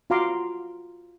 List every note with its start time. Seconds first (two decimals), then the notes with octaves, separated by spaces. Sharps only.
0.10 F4 F#4 F5 A#5 C6 D6